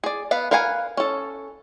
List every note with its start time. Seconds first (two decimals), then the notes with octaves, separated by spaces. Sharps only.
0.04 G#4 D5
0.31 B3 B4 F5
0.51 A#4 B4 F5 F#5 G#5
0.97 C#4 A4